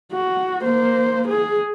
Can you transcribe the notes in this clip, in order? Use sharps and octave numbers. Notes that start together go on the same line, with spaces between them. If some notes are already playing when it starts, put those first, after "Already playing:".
F#4
A#3 C5
G#4